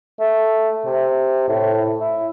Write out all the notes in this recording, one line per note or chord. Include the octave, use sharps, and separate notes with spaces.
A3
C3
A2
E4